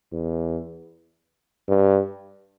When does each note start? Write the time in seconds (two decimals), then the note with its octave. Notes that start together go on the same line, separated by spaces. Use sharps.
0.12 E2
1.68 G2